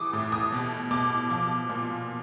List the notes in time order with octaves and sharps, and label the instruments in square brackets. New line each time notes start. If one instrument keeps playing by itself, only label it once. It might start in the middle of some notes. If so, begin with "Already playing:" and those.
Already playing: [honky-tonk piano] E3 D6 D#6
A2
D#6
B2
B2 D6
F3 D6
A#2